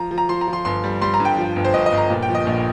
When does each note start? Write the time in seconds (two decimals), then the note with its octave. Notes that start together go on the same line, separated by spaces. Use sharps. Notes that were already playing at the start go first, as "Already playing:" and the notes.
Already playing: F3 A#5
0.11 F3
0.18 A#5
0.29 F3 C6
0.41 A#5
0.48 F3
0.53 C6
0.65 G1 C6
0.84 G3
1.02 G3 C6
1.14 A#5
1.20 G2
1.25 G5
1.38 F3
1.56 G1
1.65 C5
1.74 G1 D#5
1.86 D#5
1.92 G1
1.98 A#5
2.10 A#2
2.23 G5
2.29 F3
2.35 D#5
2.47 A#1